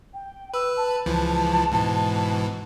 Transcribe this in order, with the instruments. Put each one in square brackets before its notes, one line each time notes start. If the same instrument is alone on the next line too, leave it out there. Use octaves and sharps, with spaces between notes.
[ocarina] G5
[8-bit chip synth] B4 [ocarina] E6
[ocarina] A5
[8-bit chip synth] C#2 E3 F3
G#2 B2 E3